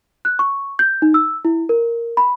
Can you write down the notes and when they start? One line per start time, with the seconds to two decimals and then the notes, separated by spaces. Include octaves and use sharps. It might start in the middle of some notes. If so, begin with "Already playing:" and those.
0.25 F#6
0.39 C#6
0.79 G6
1.02 D#4
1.14 E6
1.45 E4
1.69 A#4
2.17 B5